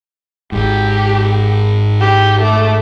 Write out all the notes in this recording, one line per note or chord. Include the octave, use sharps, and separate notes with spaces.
G#1 G#2 G4
G4
A3 D6